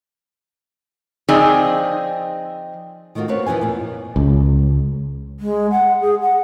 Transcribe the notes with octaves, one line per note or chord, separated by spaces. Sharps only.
F3 C4 D#4 G#4 D5 G#5
D#3 A3 A#3 F4 F#4
A#3 C4 F#4 B4 C#5
B2 E3 F3 B4 G#5
F2 A#2
C#2
G#3
F#5
G#4
F#5